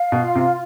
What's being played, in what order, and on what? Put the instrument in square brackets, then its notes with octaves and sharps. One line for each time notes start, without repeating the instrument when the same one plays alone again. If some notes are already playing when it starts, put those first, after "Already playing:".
Already playing: [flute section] F5
[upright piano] B2
[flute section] F4
[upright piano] C3